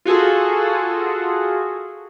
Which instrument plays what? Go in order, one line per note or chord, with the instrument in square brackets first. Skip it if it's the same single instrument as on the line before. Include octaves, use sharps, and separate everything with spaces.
[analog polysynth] F4 F#4 G#4 A4